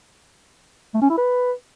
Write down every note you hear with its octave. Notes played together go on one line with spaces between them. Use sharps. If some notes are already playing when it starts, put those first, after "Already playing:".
A3
C#4
E4
B4